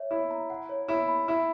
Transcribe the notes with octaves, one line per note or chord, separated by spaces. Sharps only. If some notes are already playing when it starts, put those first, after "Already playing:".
Already playing: C#5 E5
E4 C#5
A#5
F#5
C#5
E4 C#5
B5
E4 E5